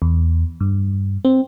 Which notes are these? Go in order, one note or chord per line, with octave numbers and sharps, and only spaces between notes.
E2
G2
C4